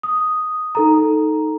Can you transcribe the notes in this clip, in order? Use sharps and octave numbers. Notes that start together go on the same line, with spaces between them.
D#6
D#4 A4 A#5